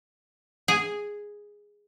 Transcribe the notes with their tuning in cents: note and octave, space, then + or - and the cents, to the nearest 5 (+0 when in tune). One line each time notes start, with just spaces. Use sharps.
G#4 -5